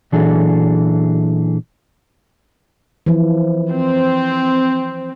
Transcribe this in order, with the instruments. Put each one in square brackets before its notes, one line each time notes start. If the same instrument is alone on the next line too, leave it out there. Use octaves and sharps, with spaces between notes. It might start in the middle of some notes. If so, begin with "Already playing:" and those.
[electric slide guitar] A#2 E3 F#3 D4 G#4 A4
[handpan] E3 F3
[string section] C4